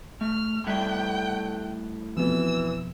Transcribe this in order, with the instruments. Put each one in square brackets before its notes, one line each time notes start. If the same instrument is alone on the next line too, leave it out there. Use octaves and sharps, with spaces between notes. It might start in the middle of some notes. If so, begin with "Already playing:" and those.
[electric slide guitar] A3 [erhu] F6
[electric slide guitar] A2 G3 E5 [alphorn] A3 [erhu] G5 [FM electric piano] F#6
[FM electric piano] F2 B2 [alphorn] E3 [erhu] E6